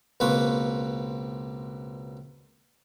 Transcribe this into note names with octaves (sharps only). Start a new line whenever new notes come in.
C#2 B2 A#3 C4 B4 C#6